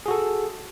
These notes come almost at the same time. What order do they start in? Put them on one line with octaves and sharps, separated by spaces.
G#4 F#4 A4